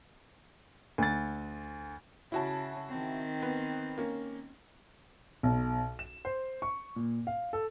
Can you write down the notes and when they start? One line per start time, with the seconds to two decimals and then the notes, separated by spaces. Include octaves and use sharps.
0.98 D2 A6
2.32 C#3 E4 F#4 A5
2.89 D#3 C4
3.42 B3
3.98 A#3 C#4
5.43 B1
5.99 E7
6.25 C5
6.62 C#6
6.96 A#2
7.27 F5
7.53 A4